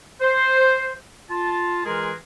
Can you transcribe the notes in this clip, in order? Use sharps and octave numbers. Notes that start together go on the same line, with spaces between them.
C5
F4 A5
E3 G#3 F4 G#4 A#4